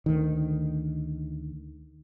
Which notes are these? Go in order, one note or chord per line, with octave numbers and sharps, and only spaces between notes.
D2 D#3